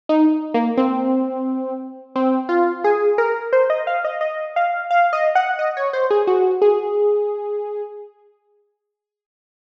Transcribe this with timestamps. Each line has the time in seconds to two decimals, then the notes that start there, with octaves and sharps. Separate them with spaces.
0.09 D#4
0.54 A#3
0.77 C4
2.16 C4
2.49 F4
2.84 G#4
3.18 A#4
3.53 C5
3.70 D#5
3.87 F5
4.04 D#5
4.21 D#5
4.56 F5
4.91 F5
5.13 D#5
5.35 F#5
5.59 D#5
5.77 C#5
5.93 C5
6.11 G#4
6.27 F#4
6.62 G#4